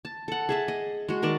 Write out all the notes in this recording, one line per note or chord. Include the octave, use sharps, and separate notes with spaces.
A5
A4 F#5
G#4 E5 A5
D#5
G#3 F#4
D#3 A#4 D5 A5